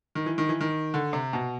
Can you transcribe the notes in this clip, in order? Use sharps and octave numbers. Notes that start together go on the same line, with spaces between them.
D#3
E3
D#3
E3
D#3
D3
C3
B2